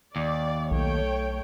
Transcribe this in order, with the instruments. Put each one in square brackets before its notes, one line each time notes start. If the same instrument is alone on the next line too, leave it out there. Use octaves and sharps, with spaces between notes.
[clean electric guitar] D#2 [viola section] D5
[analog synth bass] B1 [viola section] A3 C#5 G5